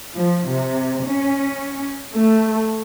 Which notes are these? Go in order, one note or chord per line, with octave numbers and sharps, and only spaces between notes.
F3
C3
C#4
A3